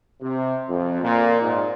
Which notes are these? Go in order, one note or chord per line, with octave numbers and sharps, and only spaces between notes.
C3
F2
A#2
G#2